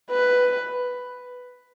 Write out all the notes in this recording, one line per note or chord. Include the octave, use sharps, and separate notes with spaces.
B4